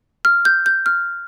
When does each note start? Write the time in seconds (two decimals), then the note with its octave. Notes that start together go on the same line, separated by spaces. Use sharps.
0.25 F6
0.45 G6
0.66 G6
0.86 F6